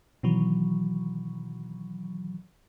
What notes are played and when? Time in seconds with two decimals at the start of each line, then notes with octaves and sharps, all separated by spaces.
0.23 B2 D#3 E3 F#3